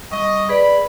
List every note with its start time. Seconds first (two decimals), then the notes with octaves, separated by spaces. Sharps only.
0.12 G3 D#5 C#6
0.49 G#4 B4 D5 B5